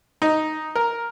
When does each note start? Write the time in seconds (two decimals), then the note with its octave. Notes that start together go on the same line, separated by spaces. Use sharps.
0.22 D#4
0.75 A#4